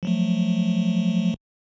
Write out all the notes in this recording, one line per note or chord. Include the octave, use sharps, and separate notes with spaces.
F3 F#3 A3